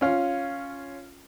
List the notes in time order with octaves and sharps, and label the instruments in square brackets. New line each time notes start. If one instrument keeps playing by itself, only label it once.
[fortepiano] C#4 F4